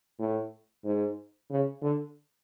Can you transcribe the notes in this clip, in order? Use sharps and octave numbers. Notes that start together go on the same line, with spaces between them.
A2
G#2
C#3
D3